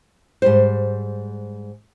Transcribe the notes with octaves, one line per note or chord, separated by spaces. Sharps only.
G#2 G3 C5